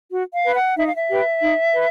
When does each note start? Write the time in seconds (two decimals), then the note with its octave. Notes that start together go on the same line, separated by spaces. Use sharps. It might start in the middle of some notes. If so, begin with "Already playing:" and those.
0.11 F#4
0.33 F5
0.44 B4
0.55 F#5
0.77 D#4 E5
0.86 F5
0.95 E5
1.10 G4 B4
1.43 D#4
1.75 B4